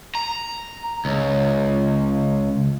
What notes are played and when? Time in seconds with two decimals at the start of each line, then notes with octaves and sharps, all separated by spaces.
0.15 A#5
1.05 C#2